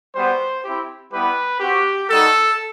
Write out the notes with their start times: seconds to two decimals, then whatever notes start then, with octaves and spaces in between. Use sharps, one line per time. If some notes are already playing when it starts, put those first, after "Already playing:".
0.15 G3 B3 F#4 C5
0.64 C4 E4 G4
1.13 G3 B3 E4 G4 B4
1.60 C4 F#4 G4
2.09 G3 D#4 F#4 A4